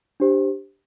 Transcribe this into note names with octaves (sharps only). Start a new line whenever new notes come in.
D4 G4 C5